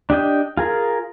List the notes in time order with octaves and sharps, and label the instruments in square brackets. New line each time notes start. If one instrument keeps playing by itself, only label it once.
[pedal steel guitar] D4 G4 D#5 G5
F4 G#4 A#4